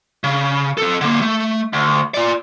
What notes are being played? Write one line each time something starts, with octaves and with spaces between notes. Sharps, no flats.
C#3
C4 A4
D3 A#3
A3
D2
F4 D5